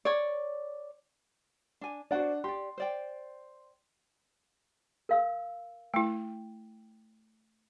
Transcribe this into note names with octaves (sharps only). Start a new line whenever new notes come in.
C#5 D5
D4 G#5
D4 F#4 C5 D5 F#5
G4 D5 C6
C5 D5 G5
A#4 F5 E6
A3 E4 G5